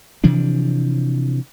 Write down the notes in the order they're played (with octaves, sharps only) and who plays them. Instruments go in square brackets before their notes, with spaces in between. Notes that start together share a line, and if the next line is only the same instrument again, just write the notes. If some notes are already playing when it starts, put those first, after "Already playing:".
[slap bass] C3 E3 F3 D4